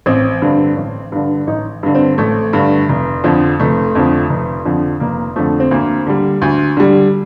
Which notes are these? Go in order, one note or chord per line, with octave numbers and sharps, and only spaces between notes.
A1 C4
G2 D3
A1
G2 D3
A1 D#4
G2 D3
C4
A1 A3
G2 D3
F1
F2 D3 F3
F1 A3
F2 D3 F3
F1
F2 D3 F3
F1 A#3
F2 D3 F3 A3
C4
D2 A#3
D3 G3
D2
D3 G3